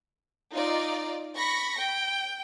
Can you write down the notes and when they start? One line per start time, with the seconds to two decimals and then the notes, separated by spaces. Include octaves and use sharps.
0.53 D#4 F4 D5
1.37 B5 C#6 A#6
1.78 G5